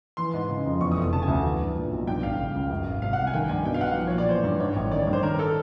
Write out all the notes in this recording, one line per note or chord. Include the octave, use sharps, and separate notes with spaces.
E3 C6
G#2
C#3
F2
E2 C#6
D#6
F1
D#6
C#3 A5
G#5
D2
E3
G2
A#2
B1
G2 G5
A1 F5
C#3
C#2
F#2
G#1
C3 F5
F#5
C2
G#5
D#3 G5
G2 G#5
B2 G5
F5
B1 F#5
F3
C#5
A#2
D5
E3 C5
G2
G#2 C#5
A1
D#3 D5
C#5
G2
C5
D#3 A#4
A#4
A4